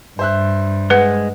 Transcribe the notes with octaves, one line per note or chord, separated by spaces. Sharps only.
G2 C5 E5 F#6
G#3 B4 F#5